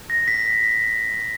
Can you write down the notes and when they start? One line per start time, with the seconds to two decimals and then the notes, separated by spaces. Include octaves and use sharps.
0.10 A#6
0.28 B6